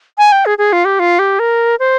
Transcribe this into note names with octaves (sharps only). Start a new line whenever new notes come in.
G#5
G5
G#4
G#4
F4
G4
F4
G4
A#4
C5